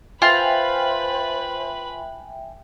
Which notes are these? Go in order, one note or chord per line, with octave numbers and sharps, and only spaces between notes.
F4 B4 C5 E5 G5 G#5 B5